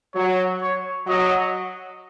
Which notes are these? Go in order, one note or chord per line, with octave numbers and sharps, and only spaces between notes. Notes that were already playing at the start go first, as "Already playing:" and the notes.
F#3 C#5
C#5
F#3 D#5